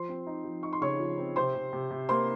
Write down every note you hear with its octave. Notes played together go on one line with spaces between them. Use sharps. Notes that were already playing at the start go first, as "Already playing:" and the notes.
Already playing: F3 C5 C6
C4
D#4
F3
D#4 C#6
C6
C#3 C#5 C#6
F3
C4
C3 C5 C6
C3
C3
C3
A#3 C5 C6